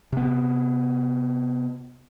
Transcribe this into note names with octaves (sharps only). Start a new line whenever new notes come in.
C3 B3